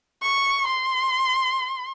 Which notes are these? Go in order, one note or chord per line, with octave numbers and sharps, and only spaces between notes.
C#6
C6